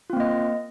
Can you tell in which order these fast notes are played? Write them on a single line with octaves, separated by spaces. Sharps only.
F4 C4 A#3 D#5